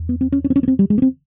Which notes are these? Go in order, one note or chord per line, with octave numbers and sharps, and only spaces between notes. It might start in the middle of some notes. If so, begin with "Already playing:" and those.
Already playing: E2
B3
C4
C#4
C#4
C4
C#4
B3
C4
G3
G#3
B3
C4